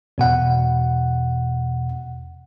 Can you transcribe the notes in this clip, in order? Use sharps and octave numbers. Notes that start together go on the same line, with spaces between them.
E2 B2 F#5